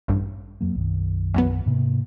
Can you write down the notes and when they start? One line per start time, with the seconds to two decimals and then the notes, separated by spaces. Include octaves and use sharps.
0.08 A1 G2
0.61 F2 F#3 A#3
0.75 B1 F#2 D#3
1.34 E2 F#3 B3
1.66 G#2 C3 A#3